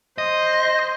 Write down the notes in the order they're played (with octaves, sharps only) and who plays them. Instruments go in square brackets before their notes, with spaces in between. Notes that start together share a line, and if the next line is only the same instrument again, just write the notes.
[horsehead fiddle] C5 [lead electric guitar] D#5